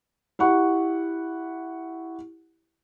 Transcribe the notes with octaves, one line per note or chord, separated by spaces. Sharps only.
E4 G4 F#5 C#6